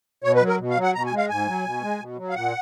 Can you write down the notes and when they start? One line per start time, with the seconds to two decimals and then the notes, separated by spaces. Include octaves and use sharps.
0.24 B2 C#5
0.36 B4
0.41 F#3
0.48 A#4
0.59 B2
0.70 F5
0.76 F#3
0.83 F#5
0.94 B2 A#5
1.06 G#5
1.12 G#3
1.17 F5
1.29 G#2 G#5
1.47 F#3
1.65 B2
1.82 G#3
2.00 B2
2.17 F#3
2.30 F5
2.35 A#2 F#5